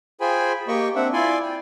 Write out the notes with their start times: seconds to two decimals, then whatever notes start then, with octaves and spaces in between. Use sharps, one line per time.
0.20 F4 G#4 C5 G5 G#5 B5
0.68 A#3 G4 D#5 G5 C#6
0.95 C4 D4 E5 F#5
1.13 E4 F4 D5 G#5 C6
1.42 G5